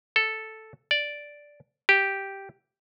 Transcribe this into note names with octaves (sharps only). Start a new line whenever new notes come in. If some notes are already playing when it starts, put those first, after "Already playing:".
A4
D5
G4